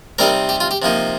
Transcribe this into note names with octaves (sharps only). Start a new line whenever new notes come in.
C3 G3 C4 D#4 A#4
G4
F4
G4
C3 F3 A#3 D#4